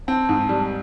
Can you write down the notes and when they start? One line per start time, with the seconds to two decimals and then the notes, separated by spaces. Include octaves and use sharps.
0.08 C4 A5
0.29 G#2
0.49 G3